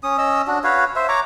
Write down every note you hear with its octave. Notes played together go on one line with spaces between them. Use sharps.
C#4 D#6
C#4 D#5 E6
D4 F#4
F#4 B4 C#5 F5
C5 E5
C#5 A#5 C#6 D6